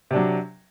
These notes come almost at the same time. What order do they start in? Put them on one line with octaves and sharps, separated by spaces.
C3 D4 F#3